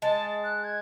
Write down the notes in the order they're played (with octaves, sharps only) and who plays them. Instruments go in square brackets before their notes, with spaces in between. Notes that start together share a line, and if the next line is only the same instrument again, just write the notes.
[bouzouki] G#3 [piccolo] A5
[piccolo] F#6
G#6